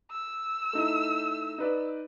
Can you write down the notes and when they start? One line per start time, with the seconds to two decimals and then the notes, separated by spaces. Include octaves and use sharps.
0.11 E6
0.73 A3 D#4 E4
1.58 D#4 B4 D5